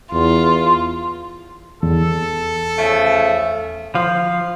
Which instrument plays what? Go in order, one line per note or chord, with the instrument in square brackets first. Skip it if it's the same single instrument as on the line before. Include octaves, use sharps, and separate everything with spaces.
[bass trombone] E2 [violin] F4
[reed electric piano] E2 [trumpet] A4
[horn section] C#3 F3 A3
[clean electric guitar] F3 [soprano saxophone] F5